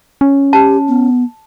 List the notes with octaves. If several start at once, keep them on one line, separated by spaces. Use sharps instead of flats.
C#4
G4 A5
B3